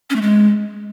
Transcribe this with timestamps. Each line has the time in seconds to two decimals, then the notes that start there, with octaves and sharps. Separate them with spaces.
0.10 C#4
0.16 A3
0.22 G#3